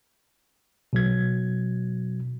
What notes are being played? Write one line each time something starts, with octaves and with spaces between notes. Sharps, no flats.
B2 F#3 G#6